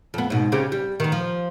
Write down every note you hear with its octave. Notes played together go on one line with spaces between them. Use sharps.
F2 B3
G#2 B2
C#3 C4 G4
G3
D#3 B3
F3